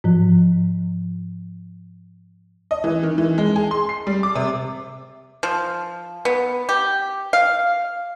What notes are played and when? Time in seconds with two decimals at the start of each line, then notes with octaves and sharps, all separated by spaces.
0.04 G#2 F3
2.71 D#5
2.84 E3
3.03 D#3
3.18 E3
3.38 G#3
3.56 G#4
3.71 C6
3.89 C7
4.07 G3
4.23 D6
4.36 C3
5.43 F3
6.25 B3
6.69 G4
7.33 F5